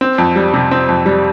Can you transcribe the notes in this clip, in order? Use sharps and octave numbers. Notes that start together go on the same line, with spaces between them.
C4
F2
G3
C3
C4
F2
G3